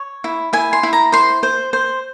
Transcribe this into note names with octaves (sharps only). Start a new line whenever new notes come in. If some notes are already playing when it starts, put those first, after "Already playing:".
Already playing: C#5
E4
E4 G#5
C6
E4
A#5
C5 C6
C5
C5